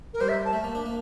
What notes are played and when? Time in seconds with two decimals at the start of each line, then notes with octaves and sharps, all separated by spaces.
0.14 A#4
0.21 G3 C5
0.29 E5
0.45 A5
0.53 A3
0.64 A#3
0.75 D4
0.86 A#3